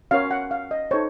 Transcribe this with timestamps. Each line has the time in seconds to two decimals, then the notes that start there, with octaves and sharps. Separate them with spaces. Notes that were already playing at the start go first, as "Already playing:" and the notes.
0.11 C#4 F#4 A#4 C#5 F5
0.31 F#5
0.51 F5
0.71 D#5
0.91 D#4 A4 C5 C#5